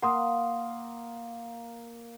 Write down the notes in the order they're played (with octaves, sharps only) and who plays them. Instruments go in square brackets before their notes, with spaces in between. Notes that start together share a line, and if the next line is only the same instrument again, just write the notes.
[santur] A#3 [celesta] F#5 C6 D#6